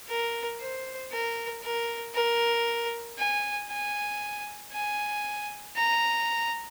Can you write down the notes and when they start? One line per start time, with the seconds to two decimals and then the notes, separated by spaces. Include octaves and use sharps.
0.09 A#4
0.61 C5
1.12 A#4
1.63 A#4
2.15 A#4
3.18 G#5
3.69 G#5
4.73 G#5
5.76 A#5